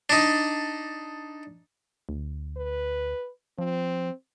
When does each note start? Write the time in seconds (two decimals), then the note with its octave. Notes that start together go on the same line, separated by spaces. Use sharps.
0.10 D4 D#4
2.09 D2
2.57 B4
3.59 F3 C4